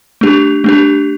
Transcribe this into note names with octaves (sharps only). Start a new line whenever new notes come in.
A3 D4 G4
A3 D4 G4